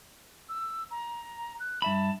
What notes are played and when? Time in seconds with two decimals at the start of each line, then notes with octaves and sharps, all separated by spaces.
0.49 E6
0.91 A#5
1.60 F#6
1.82 G2 E5 A5 B5